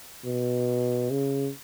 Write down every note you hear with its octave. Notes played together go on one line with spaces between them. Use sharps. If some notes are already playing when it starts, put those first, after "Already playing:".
B2
C#3